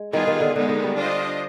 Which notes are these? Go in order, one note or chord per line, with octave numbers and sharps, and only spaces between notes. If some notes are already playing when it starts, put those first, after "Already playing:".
Already playing: G#3
D#3 G3 B3 F4 G#4
D#3
D3
D3 D#3 G#3 B3 D#4
D3
G3
D4 F4 C5 D#5